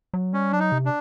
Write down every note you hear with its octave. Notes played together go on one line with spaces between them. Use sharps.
F#3
G3 C#4
F#3 D4
D#4
C3
D4